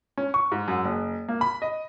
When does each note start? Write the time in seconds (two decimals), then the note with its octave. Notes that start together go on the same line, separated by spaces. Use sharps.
0.17 C#4
0.34 C#6
0.52 G#2
0.68 F#2
0.85 F#1
1.29 A#3
1.41 B5
1.62 D#5